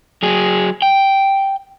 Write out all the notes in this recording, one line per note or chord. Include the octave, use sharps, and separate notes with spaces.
F#3 G#4
G5